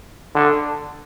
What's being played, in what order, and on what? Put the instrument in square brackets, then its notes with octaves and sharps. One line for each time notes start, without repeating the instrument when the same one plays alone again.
[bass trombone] D3